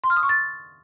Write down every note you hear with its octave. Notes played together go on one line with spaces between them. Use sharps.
C6
F6
D#6
C#6
A6